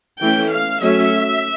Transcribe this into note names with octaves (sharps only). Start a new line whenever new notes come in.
E3 A3 C#4 G5
F5
F#3 A3 C#4 E5